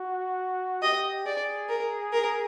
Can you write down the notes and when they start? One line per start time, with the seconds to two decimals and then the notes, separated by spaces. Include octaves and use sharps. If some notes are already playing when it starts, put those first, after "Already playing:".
Already playing: F#4
0.82 G4 D#5
1.25 G#4 D5
1.69 A#4
2.12 A#4